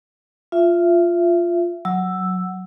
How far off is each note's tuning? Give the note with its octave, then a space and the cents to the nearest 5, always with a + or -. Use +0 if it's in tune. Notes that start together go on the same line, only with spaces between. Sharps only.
F4 +0 E5 +25
F#3 +0 E6 +0